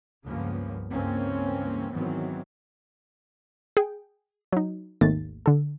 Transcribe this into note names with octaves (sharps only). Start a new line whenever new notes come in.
C#2 G2 F3 A#3 B3 C#4
C#2 G2 E3 A#3 C4 C#4
G#2 D#3 E3 F#3 B3 C4
G#4 G5
F#3 D#4
G#1 D#2 A3 A6
D3 A4